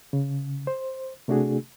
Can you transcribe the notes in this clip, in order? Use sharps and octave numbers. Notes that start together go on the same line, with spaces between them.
C#3
C5
C3 A3 D4 F#4 G#4